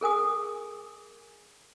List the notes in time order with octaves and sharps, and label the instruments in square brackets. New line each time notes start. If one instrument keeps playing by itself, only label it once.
[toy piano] G#4 A#4 G#5 D#6